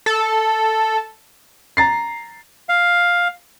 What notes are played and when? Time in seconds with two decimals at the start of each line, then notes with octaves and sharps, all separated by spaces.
0.06 A4
1.77 A#5 A6 C7
2.69 F5